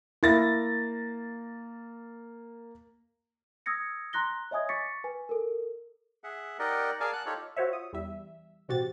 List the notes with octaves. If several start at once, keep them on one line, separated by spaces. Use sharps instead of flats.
A#3 E4 A6 A#6
D#6 E6 G#6 A#6 C#7
A#5 C6 F#6 A#6 G7
C#5 D#5 E5 G#5 D#6 G#6
C#6 D6 A6 B6 C#7
B4 G#5
A4 A#4
G#4 E5 F#5
D#4 G4 A#4 D5 D#5 F#5
G#4 A#4 D5 F5 G#5 A5
F#5 A5 F#6
D#4 F4 G4 A4 C#5
F4 F#4 C5 C#5 E5
D#6
E2 G3 E5
A1 B2 C4 F#4 G4 A6